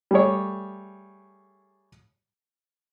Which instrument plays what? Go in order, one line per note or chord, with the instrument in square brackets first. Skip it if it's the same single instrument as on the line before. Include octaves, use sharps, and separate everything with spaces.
[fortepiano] G3 A3 G#4 C#5